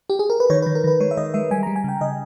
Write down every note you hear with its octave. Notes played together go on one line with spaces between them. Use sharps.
G4
G#4
A#4
B4
D#3 C#5
B4
D#3
A#4
D#3 B4
G#3 C#5
E5
D#3 D#5
G#3 E5
G3 G#5
A#5
G3
G#5
C#3 G5
C#3 D#5